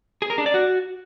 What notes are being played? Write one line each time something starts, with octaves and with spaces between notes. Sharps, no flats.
G#4
A#4
D4
D5
F#4